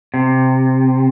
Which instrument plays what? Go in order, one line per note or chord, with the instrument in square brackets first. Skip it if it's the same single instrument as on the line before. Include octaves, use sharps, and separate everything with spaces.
[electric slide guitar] C3